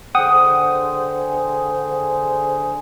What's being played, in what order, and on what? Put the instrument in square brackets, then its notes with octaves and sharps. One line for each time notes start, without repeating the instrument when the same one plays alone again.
[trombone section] D3 G#4 C5 [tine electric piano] F#5 G5 D#6